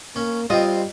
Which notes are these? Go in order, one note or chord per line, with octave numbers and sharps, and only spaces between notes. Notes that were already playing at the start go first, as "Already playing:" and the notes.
A#3 C#4
G3 C4 F4 D#5